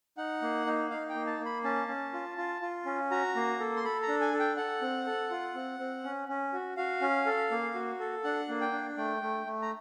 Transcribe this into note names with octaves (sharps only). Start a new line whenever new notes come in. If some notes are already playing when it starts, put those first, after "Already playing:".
D#4 F#5
A#3
D#4
D#4 F5
G5
A#3
A5
A#3
B5
C#4 A5
C#4
F4
F4
F4
C#4
F#4 A#5
A#3
A4
C6
A4 B5
A#5
D4
G#5
A4
G5
A4 F#5
C4
A4
F4
C4
C4
C#4
C#4
F#4
F#4 F5
C#4
A4
A#3
F#4
A4
D4 F#5
A#3
G5
D4
A3 G5
A3
A3
A#5